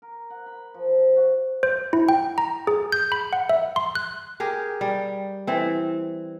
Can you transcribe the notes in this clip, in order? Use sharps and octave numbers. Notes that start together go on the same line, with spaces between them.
A#4
F#5
B5
F3
F3
F#4
C5
E4
G5
A#5
G#4
G6
B5
F#5
E5
C6
F#6
G4 G#4 A#4
G3
E3 C4